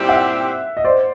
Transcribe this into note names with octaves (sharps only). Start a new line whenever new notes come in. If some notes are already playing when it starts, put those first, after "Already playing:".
Already playing: A#2 G3 C4 E4 G4
E5 F#5
D#5
C5 D5